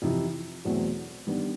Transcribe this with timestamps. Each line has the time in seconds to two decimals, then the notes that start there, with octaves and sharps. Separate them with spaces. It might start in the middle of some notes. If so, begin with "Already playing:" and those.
0.02 F2 C3 E3
0.64 E2 B2 F#3 A3 C4
1.27 D#3 G3 B3 D4